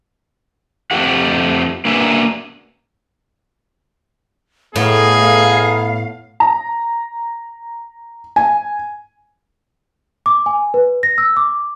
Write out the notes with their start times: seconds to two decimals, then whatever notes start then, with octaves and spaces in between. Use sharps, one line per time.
0.91 F2 A3 G4 F#5
1.85 A#3 B3 D4 F#4 E5 G#5
4.76 A2 A3 B3 D#4 G#4 F5
6.40 A#5
8.36 G#5
10.26 D6
10.46 G#5
10.74 B4
11.03 A#6
11.18 E6
11.37 D6